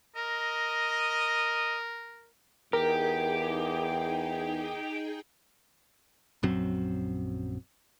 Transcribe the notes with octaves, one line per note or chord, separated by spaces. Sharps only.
A#4 D#5
E2 D#4 G4 G#4 A#4 G5
A#1 F#2 F#3 C4